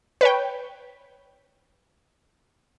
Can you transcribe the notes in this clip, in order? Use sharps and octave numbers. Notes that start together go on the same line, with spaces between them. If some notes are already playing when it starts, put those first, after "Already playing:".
B4 C#5 G5